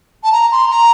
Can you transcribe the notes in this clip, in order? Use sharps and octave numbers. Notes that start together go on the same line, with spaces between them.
A5
A#5
C6
A#5